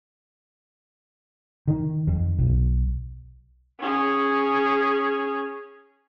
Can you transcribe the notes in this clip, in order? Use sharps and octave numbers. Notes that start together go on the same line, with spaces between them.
D#3
F2
B1
C#4 G#4